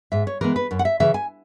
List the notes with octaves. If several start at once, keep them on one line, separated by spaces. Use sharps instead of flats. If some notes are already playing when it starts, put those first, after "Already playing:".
G#2 E5
C#5
E3 G#3 B3 A#4
B4
F#2
F#5
E5
C#3 E3 E5
G#5